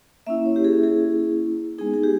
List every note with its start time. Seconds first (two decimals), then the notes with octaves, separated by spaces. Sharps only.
0.27 A#3 C#4 E4 E5
0.45 C#5
0.56 G4
0.64 G#4
0.84 G#4
1.78 G#3 B3 D#4 G#4
1.94 G#4
2.03 G4